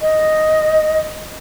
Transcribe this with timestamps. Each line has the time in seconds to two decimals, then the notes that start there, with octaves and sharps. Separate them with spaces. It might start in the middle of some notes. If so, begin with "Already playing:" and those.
0.01 D#5